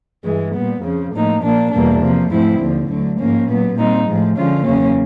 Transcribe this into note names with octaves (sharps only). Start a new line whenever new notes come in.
G2 E3 G#3
A#2 G3 B3
F2 C#3 F3
A2 F3 A#3 D#4
A#2 F3 A#3 D4
E2 B2 G3 A#3 D4
C3 F3 A#3
G#2 F3 A3 C4 E4
D#2 D3 F3
D2 D3 F#3
G#2 F3 A#3 C#4
A#2 F#3 B3
A#2 G3 C4 D#4
A2 F3 G#3
D3 F3 G#3 C#4 F4
E2 C#3 F#3 A#3 C#4